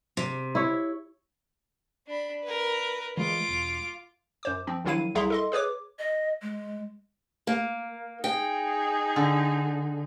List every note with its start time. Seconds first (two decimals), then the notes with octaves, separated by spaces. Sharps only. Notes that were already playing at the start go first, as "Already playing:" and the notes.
0.17 C3
0.55 E4 C#5
2.07 D4 B5
2.43 A#4 B4
3.17 E3 G#3 F4 D6
3.48 E1
4.43 F#2 C5 D6
4.67 F3 C4
4.85 A#1 D#3 F#3 E4 F5 D#7
5.15 C2 E4 G#4 E5 A#5 C6
5.30 A4 D#5 C6
5.52 G#4 B4 C#5 D6
5.99 D#5
6.42 G#3
7.47 A#3
8.24 D#4 G#4 G5
9.16 D3